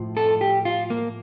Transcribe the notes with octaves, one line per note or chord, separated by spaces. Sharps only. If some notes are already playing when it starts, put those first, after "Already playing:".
Already playing: A2 F3
A4
G4
F4
A#3